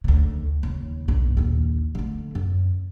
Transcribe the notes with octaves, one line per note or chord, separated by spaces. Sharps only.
D2 C#3
D#2 C#3
B1 G2
A#1 D#2
D3 A3
F#2